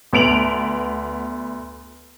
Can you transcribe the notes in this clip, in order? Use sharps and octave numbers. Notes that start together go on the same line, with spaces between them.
D2 B3 D7 F7 F#7